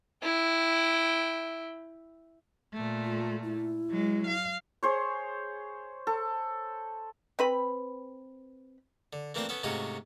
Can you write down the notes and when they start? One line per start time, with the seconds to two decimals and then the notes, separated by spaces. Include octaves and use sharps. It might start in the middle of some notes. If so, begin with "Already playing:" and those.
0.23 E4 G5
2.74 A#2 A3
3.04 F4
3.43 E4
3.91 F#3 G#3
4.27 F5
4.83 G#4 C5 C#5
6.07 A4
7.39 C4 B4 B5
9.13 D3
9.35 E3 A3 A#3 C4 D4 C5
9.49 B3 C#4 A4
9.63 G#2 C3 A3 C#4 F4 F#4